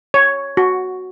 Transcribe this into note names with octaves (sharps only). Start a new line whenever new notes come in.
C#5
F#4